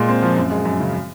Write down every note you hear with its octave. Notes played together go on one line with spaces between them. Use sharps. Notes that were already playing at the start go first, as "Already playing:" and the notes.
Already playing: A#2 G#3
C4
F3
F#2
G#3
F#2
C#3